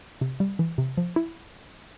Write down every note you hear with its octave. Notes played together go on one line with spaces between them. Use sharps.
C3
G3
E3
C3
F3
E4